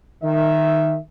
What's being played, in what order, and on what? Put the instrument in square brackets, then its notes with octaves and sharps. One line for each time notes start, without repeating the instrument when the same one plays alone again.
[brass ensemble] D#3 E5